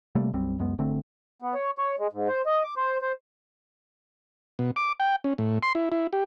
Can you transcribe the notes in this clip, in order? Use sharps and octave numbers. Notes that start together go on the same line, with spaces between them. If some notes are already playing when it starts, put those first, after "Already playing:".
C3 G3 A3 A#3
B1 F#2 G3 C4
C#2 F#2 G#3 B3
G#1 D3 A3 C4
B3
C#5
C#5
G#3
G#2
C5
D#5
D6
C5
C5
B2
D6
G5
C#4
A2
C6
E4
E4
G4